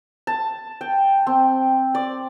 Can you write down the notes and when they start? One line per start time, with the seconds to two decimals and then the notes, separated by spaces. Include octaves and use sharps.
0.27 A5
0.81 G5
1.27 C4
1.95 D5